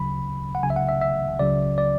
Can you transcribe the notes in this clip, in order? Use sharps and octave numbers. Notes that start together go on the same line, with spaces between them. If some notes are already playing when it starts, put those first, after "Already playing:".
Already playing: D2 C#3 F#3 B5
F#5
C#2 C#3 F#3 G#5
E5
F#5
E5
E5
C#2 C#3 F#3 D5
D5